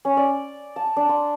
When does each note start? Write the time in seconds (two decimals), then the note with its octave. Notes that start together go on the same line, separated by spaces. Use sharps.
0.05 C#4
0.17 D5
0.76 A5
0.96 D4
1.09 C6